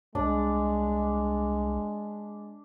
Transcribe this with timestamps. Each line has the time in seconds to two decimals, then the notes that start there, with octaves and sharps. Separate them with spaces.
0.15 C2 G#3 D4